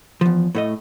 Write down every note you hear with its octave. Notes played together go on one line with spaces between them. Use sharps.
E2 F3
A2 A3 D#5